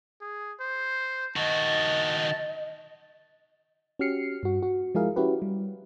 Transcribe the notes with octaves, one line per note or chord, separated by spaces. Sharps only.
G#4
C5
D#3 F#4 D#5 A5
C#4 F#4 G4 F6 C7 C#7
G2 F#4
F#4
F3 G#3 E4 G#4 A#4 F5
C#4 E4 F#4 G4 B4
G3